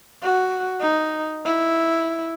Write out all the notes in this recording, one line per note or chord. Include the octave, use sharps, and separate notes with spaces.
F#4
D#4
E4